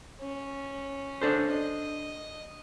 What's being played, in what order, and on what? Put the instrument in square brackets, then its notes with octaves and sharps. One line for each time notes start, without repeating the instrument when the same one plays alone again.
[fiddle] C#4
[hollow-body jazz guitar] D4 A4 C5
[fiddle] D#5